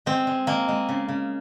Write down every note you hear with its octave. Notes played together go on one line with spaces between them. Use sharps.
G#3 C4
G#3
G#3 A#3
G#3
C#3
C#3